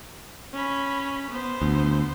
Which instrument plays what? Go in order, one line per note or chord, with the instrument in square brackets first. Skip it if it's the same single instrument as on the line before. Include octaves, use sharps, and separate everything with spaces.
[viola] C#4 B5
B3 C5
[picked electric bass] D2